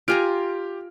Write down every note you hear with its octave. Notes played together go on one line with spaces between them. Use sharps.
F4 G4 G#5 A#5 F6 D7